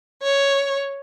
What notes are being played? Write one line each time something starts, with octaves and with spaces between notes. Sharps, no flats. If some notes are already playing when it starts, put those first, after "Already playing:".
C#5